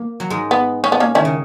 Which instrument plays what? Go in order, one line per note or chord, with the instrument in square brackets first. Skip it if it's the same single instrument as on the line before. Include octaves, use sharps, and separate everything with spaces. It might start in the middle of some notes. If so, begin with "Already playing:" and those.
Already playing: [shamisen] A#3
[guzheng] F#3
G#2 G#3
[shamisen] B3
C#4
B3
A#3 C#4
[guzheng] D#3 [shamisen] C#4 E4
[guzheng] C#3